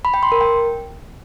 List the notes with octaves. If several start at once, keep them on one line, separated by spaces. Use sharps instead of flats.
B5
G5
C6
A#4
G5